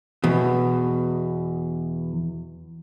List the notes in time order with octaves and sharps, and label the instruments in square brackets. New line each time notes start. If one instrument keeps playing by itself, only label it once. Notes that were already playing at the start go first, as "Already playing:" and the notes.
[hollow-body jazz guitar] E2 B2